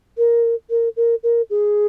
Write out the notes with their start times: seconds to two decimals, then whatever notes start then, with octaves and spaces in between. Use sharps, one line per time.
0.18 A#4
0.70 A#4
0.96 A#4
1.23 A#4
1.50 G#4